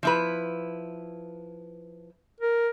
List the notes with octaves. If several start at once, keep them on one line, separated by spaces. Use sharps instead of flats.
F3 E4 B4
A#4